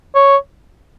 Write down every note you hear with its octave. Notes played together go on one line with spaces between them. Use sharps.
C#5